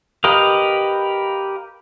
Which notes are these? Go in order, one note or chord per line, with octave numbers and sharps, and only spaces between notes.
G4 A#4 B4 D#5 F5